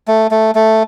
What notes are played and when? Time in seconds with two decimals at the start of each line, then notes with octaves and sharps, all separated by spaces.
0.08 A3
0.31 A3
0.55 A3